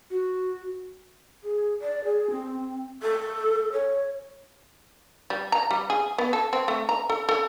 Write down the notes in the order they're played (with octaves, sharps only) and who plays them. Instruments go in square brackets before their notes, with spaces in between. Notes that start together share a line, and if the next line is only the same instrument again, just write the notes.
[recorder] F#4
[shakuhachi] G#4
D5
G#4
C4
A4
C#5
[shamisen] G3
A#5
G3
G#4
B3
A4
C4
A3
A#5
A4
A4